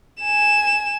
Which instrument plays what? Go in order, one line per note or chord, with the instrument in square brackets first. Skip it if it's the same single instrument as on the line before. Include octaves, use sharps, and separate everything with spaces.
[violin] G#5 E7